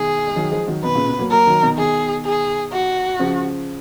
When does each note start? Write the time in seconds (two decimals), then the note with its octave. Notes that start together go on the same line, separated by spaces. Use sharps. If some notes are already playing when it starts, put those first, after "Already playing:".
Already playing: B2 D#3 G#4
0.27 G#3
0.36 D#3 F#3
0.52 F3 G#3
0.68 D#3 F#3
0.84 B2 D#3 B4
0.95 A#2 C#3
1.07 B2
1.19 F#3 A#3
1.31 F#3 A#3 A#4
1.47 D#3 F#3
1.62 B2 D#3
1.78 B2 D#3 G#4
2.25 G#4
2.72 F#4
3.19 C#3 F3